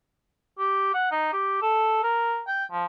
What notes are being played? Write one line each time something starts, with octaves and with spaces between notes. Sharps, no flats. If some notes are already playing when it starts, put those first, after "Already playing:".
G4
F#5
D#4
G4
A4
A#4
G5
F3